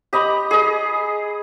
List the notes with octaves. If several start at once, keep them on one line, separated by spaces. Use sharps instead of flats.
G4 D#5 A#5 B5
G#4 D#5